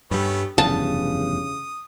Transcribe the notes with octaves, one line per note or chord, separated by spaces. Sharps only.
G2 G3 A3 B3 C#4
F1 E2 G2 C#3 A5 D#6